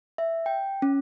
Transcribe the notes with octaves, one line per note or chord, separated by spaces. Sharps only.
E5
G5
C#4